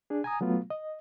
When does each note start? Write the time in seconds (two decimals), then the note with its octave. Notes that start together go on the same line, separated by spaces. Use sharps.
0.10 D4 G#4
0.24 G#5 A#5 D#6
0.41 F#3 A3 B3 F4
0.70 D#5